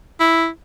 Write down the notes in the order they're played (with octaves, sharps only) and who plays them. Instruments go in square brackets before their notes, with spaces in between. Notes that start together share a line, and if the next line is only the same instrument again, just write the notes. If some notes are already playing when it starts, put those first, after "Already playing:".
[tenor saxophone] E4